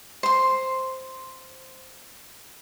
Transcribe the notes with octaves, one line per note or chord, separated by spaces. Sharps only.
C5 C6